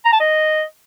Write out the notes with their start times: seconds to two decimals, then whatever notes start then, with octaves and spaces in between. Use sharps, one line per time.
0.05 A#5
0.13 A5
0.20 D#5